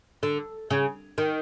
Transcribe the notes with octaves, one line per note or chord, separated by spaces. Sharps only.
D3
C#3
D#3